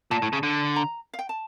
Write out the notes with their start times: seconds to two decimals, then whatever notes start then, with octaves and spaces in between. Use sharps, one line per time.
0.11 A#2 A5
0.22 A2
0.33 C#3
0.43 D3
0.76 A#5
1.13 F5
1.19 G5
1.29 A5